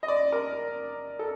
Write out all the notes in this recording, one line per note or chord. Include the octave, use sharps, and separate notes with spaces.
D#5
D5
A#4
A4